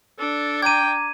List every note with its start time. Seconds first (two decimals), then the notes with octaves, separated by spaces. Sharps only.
0.19 D4 A4
0.62 G5 A#5 D6 G#6 D#7